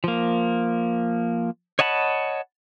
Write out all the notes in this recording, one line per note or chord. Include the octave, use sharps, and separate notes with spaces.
F3 A#3
C#5 D#5 F#5 A5 B5